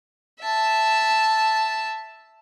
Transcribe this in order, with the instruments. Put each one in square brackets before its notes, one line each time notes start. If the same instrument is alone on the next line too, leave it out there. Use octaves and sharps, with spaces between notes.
[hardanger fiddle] E5 A5